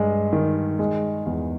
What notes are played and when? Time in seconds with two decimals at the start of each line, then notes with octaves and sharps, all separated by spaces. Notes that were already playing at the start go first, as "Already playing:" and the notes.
Already playing: G2 G#3
0.33 D#3
0.79 G#3
1.26 E2